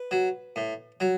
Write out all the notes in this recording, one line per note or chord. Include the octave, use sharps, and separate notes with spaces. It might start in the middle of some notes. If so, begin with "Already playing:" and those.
Already playing: B4
F#3
A2
F#3